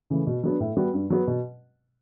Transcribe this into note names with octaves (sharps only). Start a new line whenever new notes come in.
C#3 E3 A3
B2
F#3 B3 D4
A2
G3 B3 F#4
G2
F#3 B3
B2